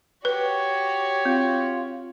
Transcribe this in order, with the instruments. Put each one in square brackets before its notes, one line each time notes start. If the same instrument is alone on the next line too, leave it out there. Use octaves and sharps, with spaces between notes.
[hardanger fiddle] F#4 G4 [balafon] B4 [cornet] C#5
[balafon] C4 [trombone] F4